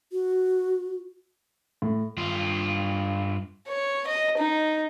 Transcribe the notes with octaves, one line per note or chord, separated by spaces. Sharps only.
F#4
A2
G2 F4
C#5
D#5
D#4